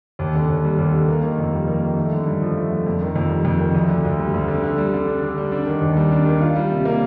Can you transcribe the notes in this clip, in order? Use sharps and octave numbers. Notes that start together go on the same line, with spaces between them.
D#2
D3
D#2
G3
D#2
D3
A#3
D#3
F2
G3
A#3
D#3
A3
D3
G2
F3
A3
D3
F2
D#3
F2
G3
F2
D#3
D2
D3
D2
G3
D2
D3
D3
G3
D3
D4
D3
G3
D4
D#3
D#2
G3
D4
D#3
F4
G3
C3
A#3